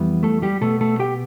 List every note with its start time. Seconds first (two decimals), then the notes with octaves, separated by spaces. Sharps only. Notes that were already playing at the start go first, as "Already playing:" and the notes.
Already playing: F2 E3 G3 B3
0.23 A3 A4
0.42 G3 G4
0.61 B2 A3 B3 A4
0.81 A3 A4
1.00 G4 G5